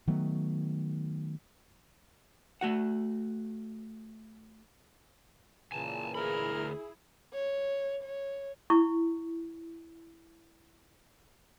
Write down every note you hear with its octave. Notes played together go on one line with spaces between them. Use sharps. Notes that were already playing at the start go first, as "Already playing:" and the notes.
D#3 F#3 A3 B3
A3 F#4 F#5
A#2 C#3 E3 G#5 A5
D2 E4 G#4 A#4 B5
C#5
C#5
E4 C#6